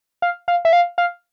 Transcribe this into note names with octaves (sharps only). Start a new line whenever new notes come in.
F5
F5
E5
F5
F5